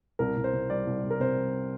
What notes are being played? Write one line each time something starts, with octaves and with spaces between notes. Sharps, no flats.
C2 A#4
C2
C5
C3
G3 D5
C2
C2
A#4
C3 C5
G3